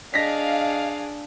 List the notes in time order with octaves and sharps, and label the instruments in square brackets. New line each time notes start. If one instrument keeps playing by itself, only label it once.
[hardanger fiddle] D4 G#4 [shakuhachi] D#5 [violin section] F5 [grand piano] A#6 B6